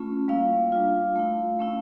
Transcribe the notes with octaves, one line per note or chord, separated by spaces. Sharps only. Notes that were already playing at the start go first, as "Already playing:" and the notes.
Already playing: A3 C#4 F4
G3 A#3 E4 F5
G3 D4 F4
A3 E4
A3 C#4 E4